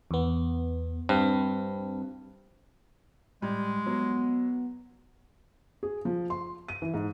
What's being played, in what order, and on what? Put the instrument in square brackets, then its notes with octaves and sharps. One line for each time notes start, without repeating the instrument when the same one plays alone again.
[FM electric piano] E2 B3
[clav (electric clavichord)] G2 [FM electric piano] C4
[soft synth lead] A2 [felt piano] G3 [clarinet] G#3
[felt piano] F#3 [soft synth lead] B3
[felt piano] G#4
F3
C6
D#7
E3
G#2